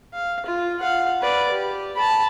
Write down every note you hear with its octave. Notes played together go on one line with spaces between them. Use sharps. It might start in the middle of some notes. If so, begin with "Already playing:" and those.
F5
F4
F5 F#5
B4 D5
G4
A5 B5